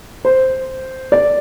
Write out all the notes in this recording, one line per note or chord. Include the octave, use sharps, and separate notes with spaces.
C5
D5